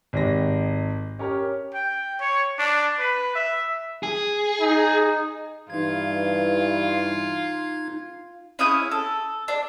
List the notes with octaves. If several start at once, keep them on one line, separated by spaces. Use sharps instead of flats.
G#1 G#3 G4 A#6
C#4 G4 A#4 F6
G5
C#5
D4
B4
E5
G#4
D#4
G2 E3 D#4 F4 G#6
C#4 E4 D#6 G6
A4
D4